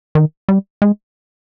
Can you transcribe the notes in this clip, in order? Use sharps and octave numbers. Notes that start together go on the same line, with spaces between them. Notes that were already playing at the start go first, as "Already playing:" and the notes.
D#3
G3
G#3